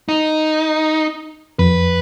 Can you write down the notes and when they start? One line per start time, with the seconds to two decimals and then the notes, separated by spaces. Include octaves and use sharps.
0.09 D#4
1.59 F2 B4